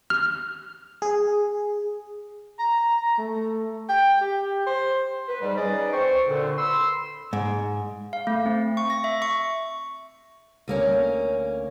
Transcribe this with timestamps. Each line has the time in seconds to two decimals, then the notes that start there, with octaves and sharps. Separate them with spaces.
0.10 F6
1.02 G#4
2.59 A#5
2.97 A#5
3.18 A3
3.89 G5
4.21 G4
4.67 C5
5.29 B4
5.42 G#2 G3
5.58 C#4 D#4 G#4 B4 D5 D#5
5.93 C4 C5 C#6
6.27 D2 A#2 D3
6.58 B5 C6 E6
7.33 G#2
8.13 F5
8.27 A3
8.46 C4
8.77 C#6
8.90 A#6
9.04 E5
9.22 C#6
10.68 D2 A#3 C#4